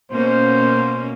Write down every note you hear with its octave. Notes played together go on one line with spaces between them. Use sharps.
B2 A#3 C#4 C5